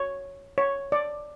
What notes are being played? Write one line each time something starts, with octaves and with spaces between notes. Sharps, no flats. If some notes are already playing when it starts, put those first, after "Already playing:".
Already playing: C#5
C#5
D5